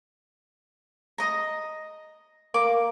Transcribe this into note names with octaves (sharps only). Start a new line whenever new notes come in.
D#5 A#5
A#3 D6